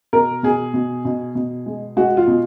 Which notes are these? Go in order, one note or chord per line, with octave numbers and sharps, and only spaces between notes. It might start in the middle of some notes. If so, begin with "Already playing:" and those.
B2 A#4
B2 G#4
B2
B2
B2
G#3
G#3 F#4
F4
B2